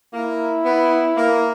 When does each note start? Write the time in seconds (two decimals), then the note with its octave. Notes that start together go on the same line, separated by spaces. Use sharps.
0.14 A#3 E4
0.65 B3
1.16 A#3